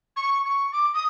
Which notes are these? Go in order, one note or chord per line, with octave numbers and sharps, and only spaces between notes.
C#6
C#6
D6
D#6